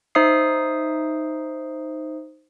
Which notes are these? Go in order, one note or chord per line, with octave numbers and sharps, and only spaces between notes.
D#4 C5 E5 D#6 C7